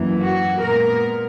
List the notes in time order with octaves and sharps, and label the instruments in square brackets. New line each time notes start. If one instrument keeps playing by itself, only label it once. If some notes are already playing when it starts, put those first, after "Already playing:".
Already playing: [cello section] F#2 E3 A#3
F#4
A#2 G#3 B3 A#4